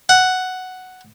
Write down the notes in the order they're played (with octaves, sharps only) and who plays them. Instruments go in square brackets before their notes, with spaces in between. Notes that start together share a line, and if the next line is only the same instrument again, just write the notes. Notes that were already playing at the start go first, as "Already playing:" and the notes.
[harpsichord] F#5